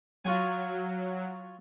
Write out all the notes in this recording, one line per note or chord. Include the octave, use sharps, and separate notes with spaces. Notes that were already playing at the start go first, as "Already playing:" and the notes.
F#3 F4 F#4 G#5